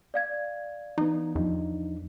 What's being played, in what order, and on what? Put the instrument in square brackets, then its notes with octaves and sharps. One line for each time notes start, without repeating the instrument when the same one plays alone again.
[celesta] D5 F5 G#6
[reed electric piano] E3 B3 [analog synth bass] D#4
[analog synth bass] E2 [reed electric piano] F3 D4 D#4